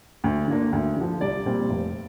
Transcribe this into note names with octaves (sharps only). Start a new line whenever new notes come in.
D2
D3 A#3 D4
D2
D3 F3
C2 D5
A#2 G3 C4
F1